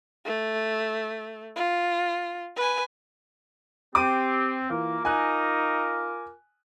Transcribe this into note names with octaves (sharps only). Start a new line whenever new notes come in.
A3
F4
B4 G#5
C4 G4 D6 D#7
E3 A#3 F4 A#4 D6
D#4 G#5 F#6